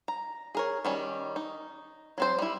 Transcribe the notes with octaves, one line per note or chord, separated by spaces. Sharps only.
A#5
G#4 A#4 C#5
D#3 G3 C#4
D#4
F#3 C4 C5
G3 E4